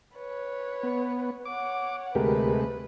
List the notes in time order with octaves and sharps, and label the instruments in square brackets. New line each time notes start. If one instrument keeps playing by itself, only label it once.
[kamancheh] B4 C#5
[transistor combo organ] B3
[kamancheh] C#5 F#5 [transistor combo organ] D6
[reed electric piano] D2 G4 A#4 [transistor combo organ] C3 G#3 A3 [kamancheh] B4